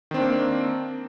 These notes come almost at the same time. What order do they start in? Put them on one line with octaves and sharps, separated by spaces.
D#3 C4 D4 A#3